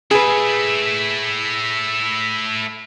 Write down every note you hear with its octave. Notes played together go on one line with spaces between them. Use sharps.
A3 E4 G#4 B4